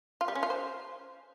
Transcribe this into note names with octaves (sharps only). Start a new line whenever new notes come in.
F4
G3
C#4
F4
C5